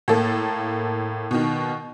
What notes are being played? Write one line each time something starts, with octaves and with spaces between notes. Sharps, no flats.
A2 A#3 A4
B2 D#3